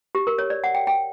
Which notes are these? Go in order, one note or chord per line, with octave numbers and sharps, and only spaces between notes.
G4
A#4
C#5
D5
F#5
G5
G5